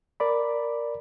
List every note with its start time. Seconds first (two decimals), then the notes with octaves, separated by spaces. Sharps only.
0.20 A#4 D5 B5